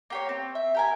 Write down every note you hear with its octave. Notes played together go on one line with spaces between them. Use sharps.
A#3 G4 C#5
C4
E5
G4 A#4 G#5